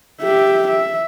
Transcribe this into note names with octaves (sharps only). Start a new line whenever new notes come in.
G4 E5
E5